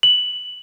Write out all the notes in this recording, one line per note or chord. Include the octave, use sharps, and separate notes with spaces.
F#7